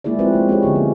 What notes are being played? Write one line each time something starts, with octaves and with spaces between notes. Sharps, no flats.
G#3 A#3 E4 G#4 D5
F3 C4 F4 F#4 B4
G#3 A#3
B3 C#4 G4 C#5
D3 F3 C#4
F3 A#3